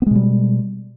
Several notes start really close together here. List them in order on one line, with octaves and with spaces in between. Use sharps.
B3 G#3 B2 G3